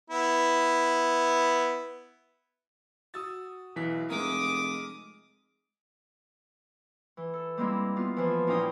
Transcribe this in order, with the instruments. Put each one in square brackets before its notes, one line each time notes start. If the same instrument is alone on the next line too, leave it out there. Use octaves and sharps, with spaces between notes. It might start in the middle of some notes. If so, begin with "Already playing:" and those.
[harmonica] B3 E4
[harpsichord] F#4 [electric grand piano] D#6 E6 A6
[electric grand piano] B1 E3 B6
[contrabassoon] F1 [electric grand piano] G#3 A#4 [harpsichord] E5 G#5 [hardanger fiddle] D6 D#6
[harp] E3
A4
G3 G#3 A#3 C4 E4
B3 F4
E3 F3
A#2 C#4 E4 F5 G5 D#6